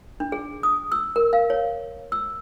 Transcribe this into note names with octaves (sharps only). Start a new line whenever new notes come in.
D4
G#4
D#6
E6
A#4
F5
C#5
E6